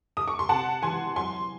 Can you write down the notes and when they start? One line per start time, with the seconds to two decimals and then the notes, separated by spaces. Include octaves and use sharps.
0.17 D#6
0.28 C#6
0.39 C6
0.49 C3 F#5 A5
0.82 E3 G#5 C6
1.16 F#3 G#5 C6